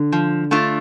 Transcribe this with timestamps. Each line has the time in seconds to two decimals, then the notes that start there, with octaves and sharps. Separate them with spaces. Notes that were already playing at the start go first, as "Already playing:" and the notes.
Already playing: D3
0.12 F3
0.51 A3 D4 F4